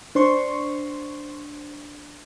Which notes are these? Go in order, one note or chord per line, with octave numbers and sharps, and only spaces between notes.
D4 C5 C6 C#6